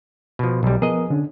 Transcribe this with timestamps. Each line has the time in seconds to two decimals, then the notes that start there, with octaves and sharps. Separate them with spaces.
0.39 B2 F3
0.63 B1 G3
0.82 F3 B3 G#4 A#4 D#5
1.10 D3 C#4 D4